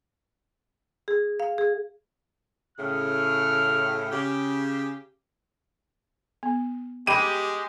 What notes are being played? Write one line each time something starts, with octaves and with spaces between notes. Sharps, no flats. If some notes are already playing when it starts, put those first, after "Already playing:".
G#4
F5
G#4
A2 C#3 F6
C#3 G4
B3
G#3 G4 G5 B5 D#7